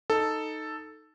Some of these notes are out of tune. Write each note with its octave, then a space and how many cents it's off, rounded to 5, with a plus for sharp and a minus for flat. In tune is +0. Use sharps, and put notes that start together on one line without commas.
D#4 +0 A4 +0